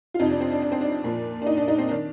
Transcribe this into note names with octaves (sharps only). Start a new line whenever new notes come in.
F4
F2 C3 F3 D#4
D4
C4
D4
D4
C4
D4
A#2 F3
D4
D#4
D4
D#4
C4
D#3 D4